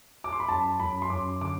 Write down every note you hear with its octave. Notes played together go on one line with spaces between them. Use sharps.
D6
C6
B5
F#2 A5
F#2 B5
C6
F#2 D6
D3 D6